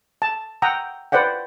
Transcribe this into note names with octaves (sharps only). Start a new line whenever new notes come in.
A5
F#5 G5 A#5 D#6 E6
B4 C5 D5 F#5 G5